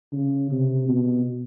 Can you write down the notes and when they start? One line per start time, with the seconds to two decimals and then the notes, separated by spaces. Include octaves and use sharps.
0.13 C#3
0.50 C3
0.89 B2